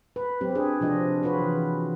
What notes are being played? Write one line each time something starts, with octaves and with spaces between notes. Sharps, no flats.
B4
F#3 C4 G4
D4 G#4 B4
C3 F3 D4 F4 D#5
F4 F#4 G#4 B4 C#5
E3